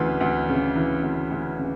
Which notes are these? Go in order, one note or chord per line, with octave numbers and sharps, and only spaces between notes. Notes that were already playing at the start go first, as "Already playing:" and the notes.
Already playing: D2 C#3 E3 B4
D2
C#3
E3
D2
D2
C#3